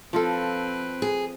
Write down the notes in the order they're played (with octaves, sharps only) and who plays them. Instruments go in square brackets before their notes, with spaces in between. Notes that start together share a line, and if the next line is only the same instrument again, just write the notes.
[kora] F3 F4 A4 [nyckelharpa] C4 B4
[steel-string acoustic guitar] G#4